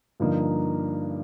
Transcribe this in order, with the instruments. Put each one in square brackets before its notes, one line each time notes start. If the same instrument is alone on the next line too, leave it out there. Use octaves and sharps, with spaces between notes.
[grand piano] G2 D3 F3 A#3 D#4